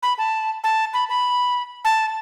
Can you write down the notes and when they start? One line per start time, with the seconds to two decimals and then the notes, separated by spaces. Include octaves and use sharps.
0.03 B5
0.18 A5
0.64 A5
0.94 B5
1.09 B5
1.85 A5